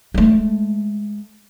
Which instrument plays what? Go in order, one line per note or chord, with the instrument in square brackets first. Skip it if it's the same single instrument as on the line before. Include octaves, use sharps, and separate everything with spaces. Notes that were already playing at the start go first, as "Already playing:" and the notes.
[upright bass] G#3 A3